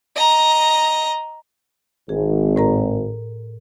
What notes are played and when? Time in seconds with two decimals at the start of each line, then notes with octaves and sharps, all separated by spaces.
0.16 D#5 A#5
2.09 G#1 G#4
2.56 A2 A#4 A#5